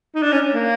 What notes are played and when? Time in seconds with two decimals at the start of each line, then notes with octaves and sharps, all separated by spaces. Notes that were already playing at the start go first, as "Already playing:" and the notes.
0.15 D#4
0.22 D4
0.32 C#4
0.54 A#3